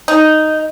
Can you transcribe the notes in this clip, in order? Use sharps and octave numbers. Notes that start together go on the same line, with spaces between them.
D#4